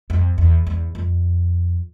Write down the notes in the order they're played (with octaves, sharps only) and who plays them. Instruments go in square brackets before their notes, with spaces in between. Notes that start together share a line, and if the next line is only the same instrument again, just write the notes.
[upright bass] F2
E2
E2
F2